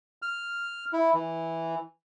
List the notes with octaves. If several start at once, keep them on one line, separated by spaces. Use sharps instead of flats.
F6
E4
E3